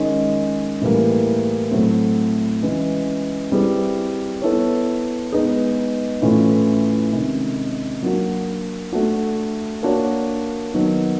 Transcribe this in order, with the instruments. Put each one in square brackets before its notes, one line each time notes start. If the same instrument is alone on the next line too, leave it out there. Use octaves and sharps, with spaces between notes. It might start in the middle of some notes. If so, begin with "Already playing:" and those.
Already playing: [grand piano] D#3 G#3 C#4
A2 E3 G3 A#3
A2 F#3 A3 C4
C#3 E3 G#3
G3 C4 E4 G#4 B4
B3 E4 A4 C#5
G#3 B3 D#4 G#4 B4
A2 E3 A3 C#4 F4
C3 D#3 G#3 C#4
F#3 A#3 D4 F#4
A3 D4 F#4
A#3 D4 F#4 A#4 C#5
D#3 F#3 B3